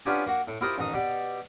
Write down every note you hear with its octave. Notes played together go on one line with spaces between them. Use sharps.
B3 C#4 D4 F4 G4 G#5
A#3 F#4
A2
E4 F4 G4 A#4 C5 D#5
A1 D#2 A#5 D#6
B2 G4 D5